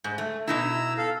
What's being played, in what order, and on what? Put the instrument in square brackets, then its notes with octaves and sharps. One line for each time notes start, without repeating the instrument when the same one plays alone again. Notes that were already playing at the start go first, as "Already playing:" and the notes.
[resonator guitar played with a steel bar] G#2
A3
[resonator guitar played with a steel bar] B2 D#4 E4 [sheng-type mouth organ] A#5 E6
[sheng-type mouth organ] A4 F5